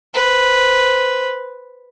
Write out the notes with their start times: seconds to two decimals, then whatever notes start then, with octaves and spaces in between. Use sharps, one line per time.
0.14 B4 C5